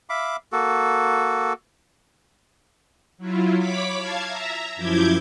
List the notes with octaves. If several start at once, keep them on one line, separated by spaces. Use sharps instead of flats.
E5 F5 B5 D6
A#3 F#4 A4
F#3 E4 F4
C#5 B5 D6 B6
F5 A5 G#6
E5 A#5
F#2 F3 E4 D6 G6 G#6